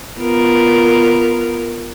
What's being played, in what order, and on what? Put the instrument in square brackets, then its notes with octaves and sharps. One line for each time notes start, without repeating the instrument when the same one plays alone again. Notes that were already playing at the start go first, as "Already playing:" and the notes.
[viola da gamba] B3 F4 A#4